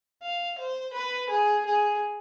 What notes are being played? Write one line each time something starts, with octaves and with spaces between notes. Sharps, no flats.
F5
C5
B4
G#4
G#4